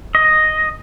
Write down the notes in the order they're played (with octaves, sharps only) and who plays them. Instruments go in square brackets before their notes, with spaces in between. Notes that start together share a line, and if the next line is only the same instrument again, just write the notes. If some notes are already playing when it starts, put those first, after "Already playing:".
[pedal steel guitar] D#5